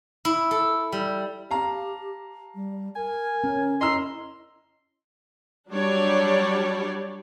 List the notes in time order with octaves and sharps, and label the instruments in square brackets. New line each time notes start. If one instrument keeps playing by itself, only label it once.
[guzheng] E4
A4
G3
[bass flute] G4 [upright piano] F5 A5 A#5
[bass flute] G3
[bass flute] A#4 [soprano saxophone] G#5
[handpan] C#4
[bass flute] E4 [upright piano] D#5 A#5 E6 [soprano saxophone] C6
[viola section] F#3 G3 D4 G4 C#5 D5